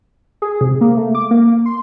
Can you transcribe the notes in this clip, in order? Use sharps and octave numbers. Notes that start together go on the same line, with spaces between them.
G#4
C3
A#3
A3
D6
A#3
C6